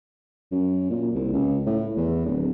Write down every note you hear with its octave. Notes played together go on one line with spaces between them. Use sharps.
F#2
A#2
C2
C#2
A2
E2
D1